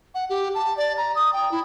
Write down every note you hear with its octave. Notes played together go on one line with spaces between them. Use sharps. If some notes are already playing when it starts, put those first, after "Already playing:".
F#5
G4
A5
D5
A#5
D#6
G5
E4